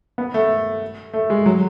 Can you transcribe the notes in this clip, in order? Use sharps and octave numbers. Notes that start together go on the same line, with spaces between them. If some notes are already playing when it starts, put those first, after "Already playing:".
B3
A3
A3
G#3
F#3